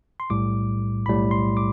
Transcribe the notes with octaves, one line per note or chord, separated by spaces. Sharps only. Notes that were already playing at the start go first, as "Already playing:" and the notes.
C6
B1 A2 G3 D6
B1 A2 G3 B5
C6
D6